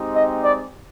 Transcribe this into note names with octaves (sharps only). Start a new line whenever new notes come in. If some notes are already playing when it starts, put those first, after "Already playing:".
Already playing: G#3 C4 D#4 G4
D#5
D5